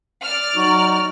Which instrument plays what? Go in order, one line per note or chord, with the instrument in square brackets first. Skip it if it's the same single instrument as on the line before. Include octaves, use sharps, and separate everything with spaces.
[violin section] D5 F6
[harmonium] F#3 D#4 F#4